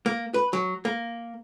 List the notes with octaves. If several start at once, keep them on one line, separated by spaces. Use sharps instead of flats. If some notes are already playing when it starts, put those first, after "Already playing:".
A#3
B4
F#3
A#3